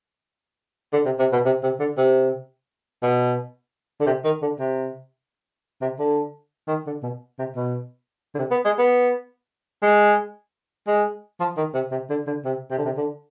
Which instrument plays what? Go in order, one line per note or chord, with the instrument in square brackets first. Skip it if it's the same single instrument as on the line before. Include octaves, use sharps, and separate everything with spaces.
[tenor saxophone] D3
C3
C3
B2
C3
C3
D3
C3
B2
D3
C3
D#3
D3
C3
C3
D3
D#3
D3
B2
C3
B2
D3
C3
B3
G#3
B3
G#3
G#3
F3
D#3
C3
C3
D3
D3
C3
C3
D3
C3
D3